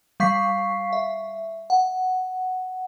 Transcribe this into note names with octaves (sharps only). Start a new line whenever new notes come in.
G3 F5 C#6 B6 C7
E5
F#5